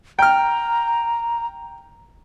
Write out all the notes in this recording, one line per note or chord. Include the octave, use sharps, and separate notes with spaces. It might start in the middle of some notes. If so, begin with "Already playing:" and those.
G5 A#5 F6